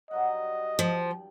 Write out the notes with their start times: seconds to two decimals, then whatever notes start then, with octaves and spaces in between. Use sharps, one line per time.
0.11 G2 F#3 D#5 F#5
0.79 F3 G5